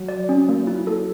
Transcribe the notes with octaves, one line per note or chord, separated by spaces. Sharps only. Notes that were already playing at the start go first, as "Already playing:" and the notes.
Already playing: F#3
D5
C#4
A#3
E4
A4